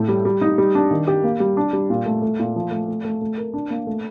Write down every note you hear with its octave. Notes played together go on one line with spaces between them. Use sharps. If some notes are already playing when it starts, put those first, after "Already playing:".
Already playing: A2 A3
G3
G3
D#4
G3
D4
D#3
G4
A#3
G3
D4
G3
A#2
A3
A3
A#2
F3
A3
A3
A3
A3
A#4
D4
A#3
A3